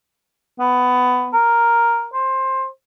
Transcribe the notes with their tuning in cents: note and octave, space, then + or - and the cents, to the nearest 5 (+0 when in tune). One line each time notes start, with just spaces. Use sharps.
B3 +15
A#4 +5
C5 +15